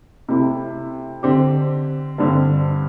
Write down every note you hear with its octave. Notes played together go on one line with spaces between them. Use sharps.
C3 A3 E4 G4
D3 C4 G4
G2 D3 C4